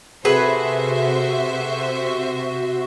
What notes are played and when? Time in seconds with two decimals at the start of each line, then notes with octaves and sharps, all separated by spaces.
0.25 C3 F#4 G#4 A4 B4 C5 E5